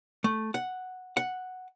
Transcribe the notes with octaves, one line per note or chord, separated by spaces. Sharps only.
A3
F#5
F#5